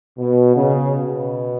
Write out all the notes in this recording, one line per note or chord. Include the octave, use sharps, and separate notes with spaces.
B2
C#3
B2